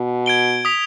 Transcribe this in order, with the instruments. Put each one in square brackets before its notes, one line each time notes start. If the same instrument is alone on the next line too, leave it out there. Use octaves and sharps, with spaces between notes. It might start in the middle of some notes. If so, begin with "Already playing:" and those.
Already playing: [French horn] B2
[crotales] G#6 D7 G7
D#6 B6 F7